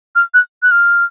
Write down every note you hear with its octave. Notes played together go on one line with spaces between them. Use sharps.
F6
F#6
F#6
F6